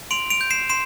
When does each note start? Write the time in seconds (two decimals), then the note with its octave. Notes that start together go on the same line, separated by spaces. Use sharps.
0.11 C6 D7 F7
0.30 D7 F7
0.41 G6
0.50 C7 E7
0.69 C6 C7 E7